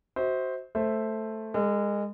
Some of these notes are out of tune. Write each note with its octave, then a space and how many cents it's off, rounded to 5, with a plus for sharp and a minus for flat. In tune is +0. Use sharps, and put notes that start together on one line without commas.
F#4 +10 C5 +0 E5 -45
A3 +0 C5 +5 E5 +0
G#3 -25 A4 +40